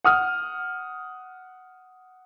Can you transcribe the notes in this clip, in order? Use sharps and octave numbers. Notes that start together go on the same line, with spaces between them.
F#5 D#6 F6